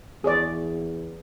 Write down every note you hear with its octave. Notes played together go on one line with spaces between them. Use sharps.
E2 G#4 C#5 D5